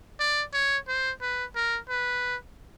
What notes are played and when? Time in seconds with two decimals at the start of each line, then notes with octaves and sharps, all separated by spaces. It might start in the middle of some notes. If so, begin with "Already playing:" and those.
0.20 D5
0.54 C#5
0.88 C5
1.21 B4
1.55 A#4
1.89 B4